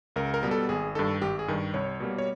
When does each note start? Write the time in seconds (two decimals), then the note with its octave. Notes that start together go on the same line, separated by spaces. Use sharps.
0.16 C#2 A#4
0.34 A#4
0.43 B2 G3 B3
0.51 A4
0.69 G#1 G#4
0.95 G2 D#3 A4
1.22 G#1 G4
1.39 G#4
1.48 G2 D#3
1.74 C2 C#5
2.00 B2 G3 A#3
2.18 C#5